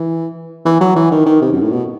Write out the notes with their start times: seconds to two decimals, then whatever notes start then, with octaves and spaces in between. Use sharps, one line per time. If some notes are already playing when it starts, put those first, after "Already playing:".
Already playing: E3
0.65 E3
0.81 F#3
0.96 E3
1.11 D#3
1.26 D#3
1.42 C3
1.53 F#2
1.62 A2
1.72 B2